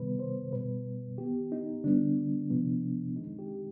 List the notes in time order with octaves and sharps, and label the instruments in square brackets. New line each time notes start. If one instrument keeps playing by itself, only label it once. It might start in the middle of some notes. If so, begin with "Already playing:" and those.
Already playing: [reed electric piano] C3 D#3 G3 B3 B4
C5
B2 G3 B3 B4
D#3 B3 G4
D#4
D3 G3 B3 D4
C3 F3 B3
D#3 G#3 C4 D#4
G4